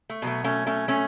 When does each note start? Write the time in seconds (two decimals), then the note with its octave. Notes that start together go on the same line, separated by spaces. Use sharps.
0.10 A3
0.22 B2 F#3 A3 B3
0.44 A3 C#4
0.67 A3 C#4
0.88 A3 C#4